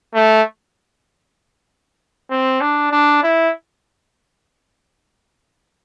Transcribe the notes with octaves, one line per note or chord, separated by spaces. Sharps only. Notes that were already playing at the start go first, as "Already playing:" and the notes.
A3
C4
D4
D4
E4